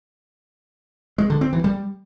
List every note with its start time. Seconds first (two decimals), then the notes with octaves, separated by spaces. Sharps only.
1.18 G#3
1.30 D3
1.41 C4
1.53 E3
1.64 G3